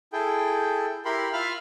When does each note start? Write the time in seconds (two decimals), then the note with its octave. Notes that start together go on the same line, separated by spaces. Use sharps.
0.13 E4 G#4 A4 G5
1.05 E4 G4 A#4 B5 C6
1.33 F4 E5 F5 B5 F6